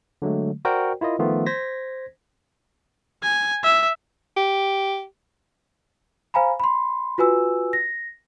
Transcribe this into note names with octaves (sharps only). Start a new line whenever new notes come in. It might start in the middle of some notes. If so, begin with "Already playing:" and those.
D3 F#3 G#3 A3
F#4 A#4 C5 D5 G5
E4 F4 A#4 D#5
D#3 F3 A3 B3 F4
C5 G#6 A#6 B6
G#5
E5
G4
C5 F5 G#5 A#5 B5
B5 C6
F4 F#4 B4 G#5 E6
A#6